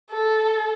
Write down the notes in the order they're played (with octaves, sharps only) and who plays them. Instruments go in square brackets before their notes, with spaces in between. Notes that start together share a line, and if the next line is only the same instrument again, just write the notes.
[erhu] A4